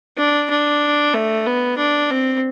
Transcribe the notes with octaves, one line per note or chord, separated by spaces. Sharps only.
D4
D4
A3
B3
D4
C4